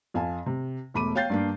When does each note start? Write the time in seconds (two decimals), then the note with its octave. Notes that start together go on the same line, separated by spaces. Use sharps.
0.14 F2 F5 G#5 A5
0.46 C3
0.94 E1 A3 B5 D6 D#7
1.15 C#5 F5 G5 G6 A6 C7
1.30 G2 A#3 D4